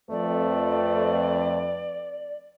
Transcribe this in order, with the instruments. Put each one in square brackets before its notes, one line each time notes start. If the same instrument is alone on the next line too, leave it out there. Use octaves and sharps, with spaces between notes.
[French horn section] F2 B4 [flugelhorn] A3 [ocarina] D5